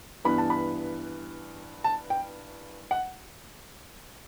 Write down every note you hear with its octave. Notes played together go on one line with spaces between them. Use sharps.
G2 E3 B3 B5
A5
B5
A5
G5
F#5